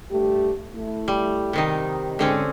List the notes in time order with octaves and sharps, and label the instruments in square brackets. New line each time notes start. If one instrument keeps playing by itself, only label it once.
[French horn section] G2 A3 G4
A3 E4
[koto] G3
C3 D#3 D#4
[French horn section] G#2 [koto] D3 C4 C#4